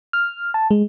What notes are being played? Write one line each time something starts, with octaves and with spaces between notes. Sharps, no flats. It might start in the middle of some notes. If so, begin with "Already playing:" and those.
F6
A5
G#3